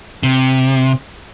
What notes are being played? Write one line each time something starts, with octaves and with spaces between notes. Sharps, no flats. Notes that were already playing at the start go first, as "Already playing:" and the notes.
C3